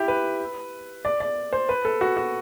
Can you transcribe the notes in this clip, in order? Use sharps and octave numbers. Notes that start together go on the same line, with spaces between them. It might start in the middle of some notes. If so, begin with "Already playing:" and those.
Already playing: E4 G4
B4
D5
D5
C5
B4
A4
F#4
F#4